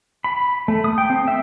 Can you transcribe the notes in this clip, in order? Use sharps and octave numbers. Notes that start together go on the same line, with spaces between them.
B5
A3
D#6
G5
C4
E5